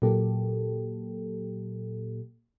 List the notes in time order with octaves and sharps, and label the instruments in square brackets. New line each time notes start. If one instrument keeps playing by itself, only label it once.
[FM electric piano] A#2 F#3 A#3 G4 A4